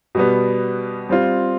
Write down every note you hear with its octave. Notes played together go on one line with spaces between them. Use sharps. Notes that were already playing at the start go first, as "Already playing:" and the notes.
B2 G3 B3
G3 C4 F4